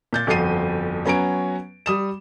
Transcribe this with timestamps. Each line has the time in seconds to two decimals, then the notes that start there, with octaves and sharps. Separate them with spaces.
0.13 A#2 G6 A6
0.27 G1 F2 F3 F#4 C7 D#7
1.05 F#3 B3 C#4 G#5 A#5 D7
1.86 G3 D#6 E7